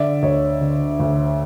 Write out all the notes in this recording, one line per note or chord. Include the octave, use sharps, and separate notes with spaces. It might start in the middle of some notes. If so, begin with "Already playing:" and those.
Already playing: D3 D5 E5
D2 C#5 D#5
D3
D2